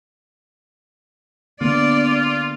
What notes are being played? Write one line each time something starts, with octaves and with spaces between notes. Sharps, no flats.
D3 A#3 B3 F4 D5